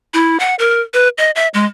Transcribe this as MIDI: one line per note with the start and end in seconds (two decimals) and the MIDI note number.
0.14 0.37 64
0.40 0.55 78
0.59 0.81 70
0.94 1.08 71
1.18 1.31 75
1.36 1.48 76
1.54 1.65 56